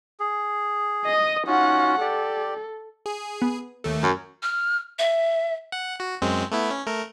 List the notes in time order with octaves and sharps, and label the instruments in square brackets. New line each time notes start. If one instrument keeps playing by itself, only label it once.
[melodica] G#4
[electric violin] D#5 D#6
[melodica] C#4 F4 F#4 [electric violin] D#4 F#5
[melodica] G4 D5 [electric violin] A4
[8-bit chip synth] G#4
[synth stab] B3
[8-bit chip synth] D#2 A3
[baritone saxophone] F#2
[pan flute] F6
E5
[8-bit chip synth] F#5
F#4
F#2 G#3 C4
A3 B3 E4
C#4
A3 A#4